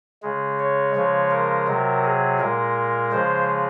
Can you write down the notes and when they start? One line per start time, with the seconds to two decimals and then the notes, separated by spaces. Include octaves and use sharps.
0.23 C#3 G#3
0.59 C#5
0.95 C#3 F3 G#3
1.31 A#4
1.68 C3 F#3
2.04 G#4
2.39 A#2 G#3 A#4
3.12 C#3 F3 G#3 C5